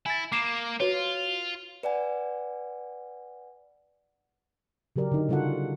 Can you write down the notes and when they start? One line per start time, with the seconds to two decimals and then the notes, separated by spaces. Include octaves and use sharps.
0.06 E4 G#5 A6
0.32 A#3 D6 C7 E7
0.80 F4 F#4 B4 C#5
1.83 B4 D5 F#5 G#5
4.96 C#3 F#3 G4 A#4 D5
5.12 D3 D#4
5.29 C#3 G3 F4 F#4 A4 F#5